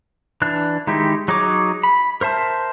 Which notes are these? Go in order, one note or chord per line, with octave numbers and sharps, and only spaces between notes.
E3 D4 F#6
D#3 G#3 D#4 E4 G4
F#3 D#4 G#4 C#5 D6
B5
A#4 C5 E5 A5